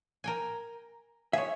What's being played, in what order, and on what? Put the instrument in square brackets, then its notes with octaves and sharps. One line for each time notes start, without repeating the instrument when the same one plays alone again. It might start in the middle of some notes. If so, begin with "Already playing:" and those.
[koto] A#4 G5 G#5
[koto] G#4 C#5 [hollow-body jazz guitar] E5